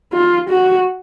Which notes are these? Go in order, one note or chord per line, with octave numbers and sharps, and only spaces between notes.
F4
F#4